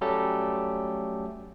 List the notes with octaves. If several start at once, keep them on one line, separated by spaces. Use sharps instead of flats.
F#3 G3 A3 C#4 G4 A4